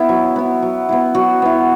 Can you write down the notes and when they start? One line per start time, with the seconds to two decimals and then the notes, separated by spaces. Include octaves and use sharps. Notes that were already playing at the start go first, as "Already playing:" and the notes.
Already playing: B3 E4
0.09 F#3
0.36 B3 E4
0.62 F#3
0.89 B3 E4
1.15 F#3 F#4
1.42 B3 E4